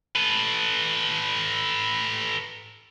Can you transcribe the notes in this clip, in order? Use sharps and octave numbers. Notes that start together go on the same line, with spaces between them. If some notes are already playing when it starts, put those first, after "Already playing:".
A4 B4